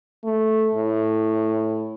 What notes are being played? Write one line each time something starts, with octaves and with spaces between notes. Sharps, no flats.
A3
A2